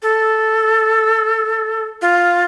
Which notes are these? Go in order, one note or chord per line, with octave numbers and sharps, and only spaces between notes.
A4
F4